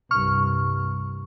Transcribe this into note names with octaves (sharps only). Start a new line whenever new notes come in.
C2 G2 C#6 F6